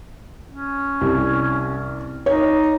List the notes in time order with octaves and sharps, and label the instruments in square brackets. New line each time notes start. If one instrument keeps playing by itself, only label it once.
[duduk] C#4
[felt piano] C2
[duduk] D#4 [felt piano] C#5